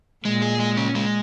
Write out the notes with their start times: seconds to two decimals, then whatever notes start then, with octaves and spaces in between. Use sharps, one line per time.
0.24 A#2 G#3
0.42 G#4
0.59 G#3
0.77 C#4
0.95 G#3